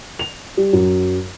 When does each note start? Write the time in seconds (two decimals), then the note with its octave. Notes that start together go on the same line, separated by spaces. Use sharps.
0.19 F7
0.57 G3
0.73 F#2